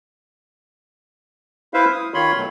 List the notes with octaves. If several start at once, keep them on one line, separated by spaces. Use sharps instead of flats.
E4 B4 C5 E5 F5
D#6
D#3 F4 C#5 B5 C6
B2 F#3 A3